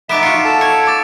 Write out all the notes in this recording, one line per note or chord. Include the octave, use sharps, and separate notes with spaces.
B3 D#4 E5 A5 D6 D7 E7
F4 F#4 C#7
A4 A5
C#5 C#7
D6 A6